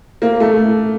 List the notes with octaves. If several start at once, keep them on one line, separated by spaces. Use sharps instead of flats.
A#3
A3